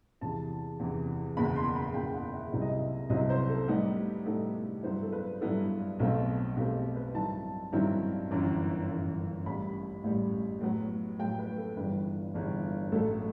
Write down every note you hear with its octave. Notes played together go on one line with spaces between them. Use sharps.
E2 C3 E3 A5
E2 C3 E3
F#1 E2 B2 B5
C6
B5
F#1 E2 B2 G5
F#5
E5
C2 C3 F#3 C4 E4 E5
D#5
E5
C2 C3 F#3 C4 E4 D#5
C5
A4
A2 G3 B3 D#4 G4
A2 G3 B3 D#4 A4
G2 F#3 B3 E4 C5
A4
B4
G2 F#3 B3 E4 A4
B1 B2 F#3 A3 C4
B1 B2 F#3 A3 C4 G4
B4
G2 D#3 F#3 C4 E4 A5
G2 D#3 F#3 C4 E4
G1 F#2 E3
G1 F#2 E3
A1 A2 G3 B5
A1 A2 G3
A2 F#3 B3
A2 F#3 B3 G5
B4
A4
G1 G2 E3 B4
G1 G2 E3
A1 A2 F#3 A3 A4